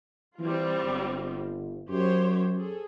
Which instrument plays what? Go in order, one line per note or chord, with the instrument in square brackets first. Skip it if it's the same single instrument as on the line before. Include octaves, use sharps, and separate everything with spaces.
[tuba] E3 [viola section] G3 C4 F4
[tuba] G1
[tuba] F#2 [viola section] G4 C5 C#5
[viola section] G#4 A4